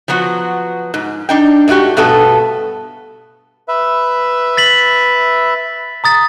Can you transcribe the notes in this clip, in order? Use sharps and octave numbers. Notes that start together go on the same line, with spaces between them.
F3 F#3 B3 F#4
G#2
D4 D#4 G5
G#2 A3 B3 F#4 G4
G2 B2 A3 B3 A4 A5
B4 E5
A6 B6 F#7
A#5 D#6 A6